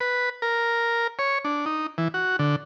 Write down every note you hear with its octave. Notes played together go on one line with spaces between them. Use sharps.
B4
A#4
C#5
D4
D#4
E3
F#4
D3